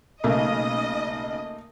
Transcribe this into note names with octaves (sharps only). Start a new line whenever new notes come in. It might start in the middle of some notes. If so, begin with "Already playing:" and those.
B1 C#3 A3 A#3 D#5